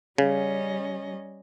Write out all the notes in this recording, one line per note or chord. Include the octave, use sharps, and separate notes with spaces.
C#3 G3 C#4 D#5